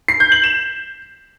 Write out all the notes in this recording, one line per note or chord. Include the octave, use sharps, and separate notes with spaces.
C7
G6
F#7
E7